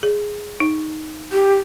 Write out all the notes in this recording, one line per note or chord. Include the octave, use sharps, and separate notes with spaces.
G#4
D#4
G4